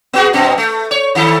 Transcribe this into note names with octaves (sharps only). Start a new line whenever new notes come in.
B3 F#4 G#4
F#2 B2 C4
A3
C#5
D#3 E4 A4